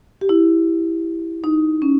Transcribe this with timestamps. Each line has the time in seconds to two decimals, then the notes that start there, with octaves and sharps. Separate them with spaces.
0.21 G4
0.29 E4
1.44 D#4
1.82 C#4